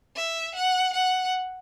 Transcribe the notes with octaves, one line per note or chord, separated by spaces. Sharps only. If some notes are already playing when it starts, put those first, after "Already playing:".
E5
F#5
F#5